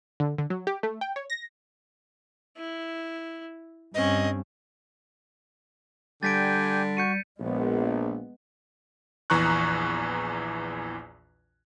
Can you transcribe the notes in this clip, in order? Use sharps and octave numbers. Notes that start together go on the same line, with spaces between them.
D3
D3
F#3
G4
A3
G5
C#5
A#6
E4
G2 C4 C#4 D#5
D3 G3 G4 G5 G#5 A6 B6 D7
F#4 G6 C#7 D#7
A#1 G#3 B3
A#1 E2 E3 A#5 C#6 F#6